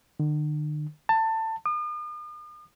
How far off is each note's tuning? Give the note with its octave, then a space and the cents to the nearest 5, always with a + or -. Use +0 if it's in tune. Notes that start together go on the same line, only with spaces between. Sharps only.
D3 +45
A5 +20
D#6 -45